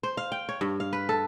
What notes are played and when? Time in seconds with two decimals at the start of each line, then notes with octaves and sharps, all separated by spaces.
0.03 C5
0.17 F5
0.32 G5
0.49 C#5
0.61 G2
0.80 F5
0.93 B4
1.09 A4